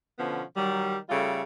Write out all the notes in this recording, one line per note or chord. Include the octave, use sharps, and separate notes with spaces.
B2 D3 F3 B3 C#4
D#3 F#3 G3
C#3 G3 A3 F4 A4